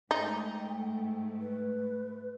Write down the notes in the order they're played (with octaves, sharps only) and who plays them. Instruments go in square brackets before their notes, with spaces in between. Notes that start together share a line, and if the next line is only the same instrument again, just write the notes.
[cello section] G#2 A3 [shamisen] D#4 [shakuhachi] G5
[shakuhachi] B4